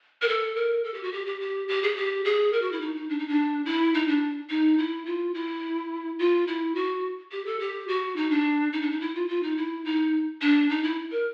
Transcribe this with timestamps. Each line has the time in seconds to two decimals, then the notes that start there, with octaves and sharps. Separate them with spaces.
0.22 A#4
0.28 A4
0.56 A#4
0.84 A4
0.94 G4
1.03 F#4
1.12 G4
1.27 G4
1.41 G4
1.68 G4
1.83 G#4
1.96 G4
2.25 G#4
2.53 A#4
2.62 F#4
2.72 E4
2.81 D#4
2.95 D#4
3.09 D4
3.19 D#4
3.28 D4
3.66 E4
3.94 D#4
4.08 D4
4.50 D#4
4.78 E4
5.06 F4
5.34 E4
6.19 F4
6.47 E4
6.75 F#4
7.32 G4
7.46 A4
7.60 G4
7.88 F#4
8.16 D#4
8.30 D4
8.73 D#4
8.82 D4
8.91 D#4
9.01 E4
9.15 F4
9.28 F4
9.43 D#4
9.57 E4
9.85 D#4
10.42 D4
10.69 D#4
10.83 E4
11.12 A#4